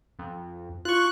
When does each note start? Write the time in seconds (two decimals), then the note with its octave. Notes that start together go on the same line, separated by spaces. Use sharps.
0.19 F2
0.85 F4 C#6 F#6